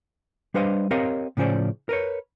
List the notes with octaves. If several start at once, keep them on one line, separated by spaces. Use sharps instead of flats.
G3 D4 B4 C5 D#5 F5
C4 G4 A#4 C#5 D#5 F5
A2 C#3 F3 C#4 C5 D5
A#4 B4 C#5